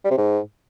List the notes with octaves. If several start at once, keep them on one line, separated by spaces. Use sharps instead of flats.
G3
C3
G#2